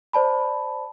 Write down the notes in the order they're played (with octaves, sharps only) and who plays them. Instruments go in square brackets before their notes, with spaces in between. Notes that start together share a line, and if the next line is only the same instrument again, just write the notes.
[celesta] C5 D5 A5 B5